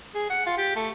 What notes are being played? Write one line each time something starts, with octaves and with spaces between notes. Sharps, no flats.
G#4
F#5
F4
G4
A3